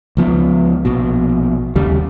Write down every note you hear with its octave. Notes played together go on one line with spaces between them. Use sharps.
C#2 F3 B3
A#1 B2
D#2 C#3 G3